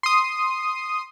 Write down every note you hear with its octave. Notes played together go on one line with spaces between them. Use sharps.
C6 D#6